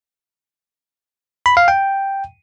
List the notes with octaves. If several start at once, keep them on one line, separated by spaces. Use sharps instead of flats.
B5
F5
G5